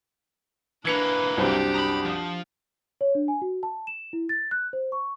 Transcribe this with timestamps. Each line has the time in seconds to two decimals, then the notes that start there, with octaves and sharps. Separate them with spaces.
0.85 E3 A#3 D4 B4 G#6 C#7 F7
1.38 C2 F#2 C4 D4 G4
1.74 A#5 B5 D#6
2.05 F3
3.01 C#5
3.15 D4
3.28 G#5
3.42 F#4
3.63 A5
3.87 E7
4.13 E4
4.29 A6
4.51 F#6
4.73 C5
4.92 C#6